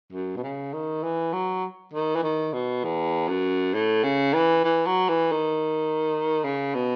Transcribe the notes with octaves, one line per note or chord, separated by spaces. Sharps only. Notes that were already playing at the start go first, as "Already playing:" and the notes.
F#2
B2
C#3
D#3
E3
F#3
D#3
E3
D#3
B2
E2
F#2
A2
C#3
E3
E3
F#3
E3
D#3
C#3
B2